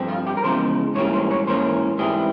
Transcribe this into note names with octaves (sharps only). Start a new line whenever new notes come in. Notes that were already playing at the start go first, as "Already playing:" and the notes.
Already playing: G2 F3 C4
F4
G4
A#4
E2 C#3 F3 G#3 C5
G#2 E3 G3 A#3 C#4 C#5
C5
C#5
G#2 E3 A#3 C#4 C5
G#2 E3 G3 C4 G#4